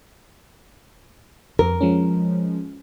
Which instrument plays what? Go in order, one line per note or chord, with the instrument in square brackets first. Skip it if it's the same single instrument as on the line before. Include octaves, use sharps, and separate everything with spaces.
[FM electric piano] F2 [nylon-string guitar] A#4
[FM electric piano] F3 G#3 C#4